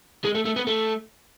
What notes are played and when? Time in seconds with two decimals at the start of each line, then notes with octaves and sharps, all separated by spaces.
0.25 G#3
0.35 A3
0.46 A3
0.56 B3
0.67 A3